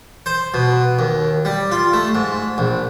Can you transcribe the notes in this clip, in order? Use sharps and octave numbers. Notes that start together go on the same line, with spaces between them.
C5
B2
D#2
G3
F4
A3
G#2
A#1